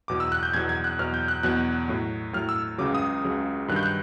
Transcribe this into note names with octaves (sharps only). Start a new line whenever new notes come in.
E2 B2 F#3 D6
E6
F#6
G6
E2 B2 F#3 G#6
G#6
F#6
E2 B2 F#3 F6
G6
F#6
E2 B2 F#3 F#6
A2 F#3
A2 F#3 F6
E6
C#2 C#3 F#3 D6
D#6
C#2 C#3 F#3
G2 D#3 F#3 F#6
G6
F#6